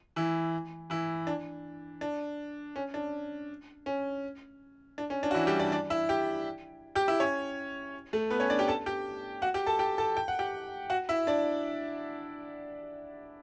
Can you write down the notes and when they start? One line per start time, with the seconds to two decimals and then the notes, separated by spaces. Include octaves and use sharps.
0.16 E3 E4
0.90 E3 E4
1.27 D4
2.01 D4
2.76 C#4
2.94 D4
3.86 C#4
4.98 D4
5.10 C#4
5.23 D4
5.31 F#4
5.35 E3 E4
5.47 G3 G4
5.59 D4 D5
5.72 D4 D5
5.90 E4 E5
6.09 G4 G5
6.95 G4 G5
7.08 E4 E5
7.20 C#4 C#5
8.13 A3 A4
8.30 B3 B4
8.40 C#4 C#5
8.50 D4 D5
8.59 G4 G5
8.68 A4 A5
8.86 G4 G5
9.42 F#4 F#5
9.54 G4 G5
9.67 A4 A5
9.79 G4 G5
9.98 A4 A5
10.17 G5
10.28 F#5
10.39 G4 G5
10.90 F#4 F#5
11.09 E4 E5
11.27 D4 D5